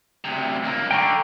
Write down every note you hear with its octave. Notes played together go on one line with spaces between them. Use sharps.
D2 C3
C#2 A#3
D3 G5 A#5 C#6